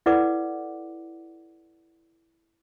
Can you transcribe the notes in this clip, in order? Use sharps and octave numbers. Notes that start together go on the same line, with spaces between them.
E4 A4 B4 D5 F#5 D6